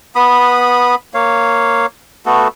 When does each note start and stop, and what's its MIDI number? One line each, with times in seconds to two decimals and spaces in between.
0.15 0.95 59
0.15 0.95 83
0.15 0.95 87
1.14 1.86 58
1.14 1.86 73
1.14 1.86 77
2.26 2.48 57
2.26 2.48 59
2.26 2.48 66
2.26 2.48 69